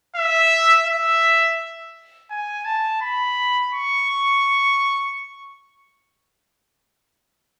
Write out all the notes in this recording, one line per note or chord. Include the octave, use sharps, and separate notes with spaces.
E5
E5
G#5
A5
B5
C#6